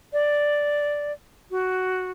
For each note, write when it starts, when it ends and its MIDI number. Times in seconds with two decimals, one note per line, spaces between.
0.13 1.12 74
1.51 2.11 66